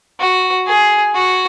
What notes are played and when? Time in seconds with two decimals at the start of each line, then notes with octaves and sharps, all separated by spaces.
0.20 F#4
0.67 G#4
1.15 F#4